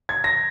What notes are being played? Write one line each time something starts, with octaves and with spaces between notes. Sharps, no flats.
G#6
A#6